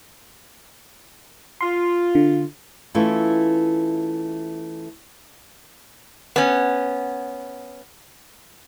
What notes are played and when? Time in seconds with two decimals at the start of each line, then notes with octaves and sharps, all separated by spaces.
1.61 F4 C6
2.15 D3
2.95 E3 A3 C#4 E4 F4
6.36 B3 C#4